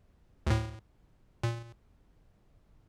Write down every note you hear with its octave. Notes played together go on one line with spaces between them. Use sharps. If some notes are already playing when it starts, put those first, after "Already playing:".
D2 A2
A#2